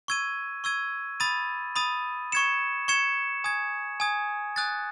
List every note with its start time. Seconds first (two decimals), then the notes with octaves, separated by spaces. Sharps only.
0.08 C#6 E6 G#6 D#7
0.64 C#6 E6 G#6 D#7
1.20 B5 D#6 A6 D#7
1.76 B5 D#6 A6 D#7
2.32 C#6 G#6 C#7 E7
2.88 C#6 G#6 C#7 E7
3.44 G#5 D#6 G#6
4.00 G#5 D#6 G#6
4.56 G#5 D#6 F#6 A6